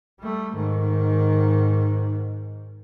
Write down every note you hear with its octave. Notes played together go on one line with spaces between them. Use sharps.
G3 A3
G#2 D#3